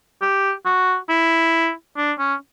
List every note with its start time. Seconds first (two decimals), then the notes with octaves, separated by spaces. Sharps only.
0.22 G4
0.66 F#4
1.09 E4
1.97 D4
2.19 C#4